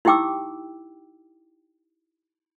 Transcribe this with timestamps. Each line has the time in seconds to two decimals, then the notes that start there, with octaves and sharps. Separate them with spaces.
0.05 D#4 E4 G4 G5 D6 E6